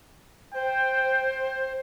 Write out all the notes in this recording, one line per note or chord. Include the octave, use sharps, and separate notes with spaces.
C5 G5